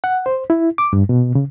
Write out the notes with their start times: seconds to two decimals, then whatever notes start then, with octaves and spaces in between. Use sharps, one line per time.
0.04 F#5
0.26 C5
0.50 E4
0.78 D6
0.93 G2
1.09 B2
1.35 C#3